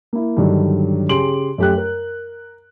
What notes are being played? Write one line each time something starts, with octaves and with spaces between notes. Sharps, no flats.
A#3 E4
G2 D3 D#3 F#3
C#3 G4 G#4 C6 D7 F#7
F#2 A3 G4 G5 F#6
A#4